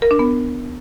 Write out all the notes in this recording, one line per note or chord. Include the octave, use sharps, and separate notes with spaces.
A#4
D4
B3